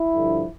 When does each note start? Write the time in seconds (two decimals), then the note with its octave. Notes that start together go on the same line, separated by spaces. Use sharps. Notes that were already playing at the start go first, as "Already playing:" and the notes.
Already playing: E4
0.14 G2 D3 F3